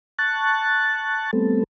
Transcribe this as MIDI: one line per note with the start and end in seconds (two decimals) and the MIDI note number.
0.19 1.31 81
0.19 1.31 85
0.19 1.31 90
0.19 1.31 93
1.33 1.64 55
1.33 1.64 57
1.33 1.64 59
1.33 1.64 60
1.33 1.64 69